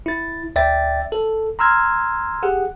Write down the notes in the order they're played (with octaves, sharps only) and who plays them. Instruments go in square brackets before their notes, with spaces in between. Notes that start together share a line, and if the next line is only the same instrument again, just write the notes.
[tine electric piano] E4 A6
D2 D5 E5 G5 A6
A4
A#5 C6 E6 F6 G#6
G4 G#4 F#5